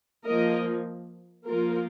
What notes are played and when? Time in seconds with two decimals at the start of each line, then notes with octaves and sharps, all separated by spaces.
0.25 F3 A#3 A#4 D#5
1.47 F3 A#3 F4 A#4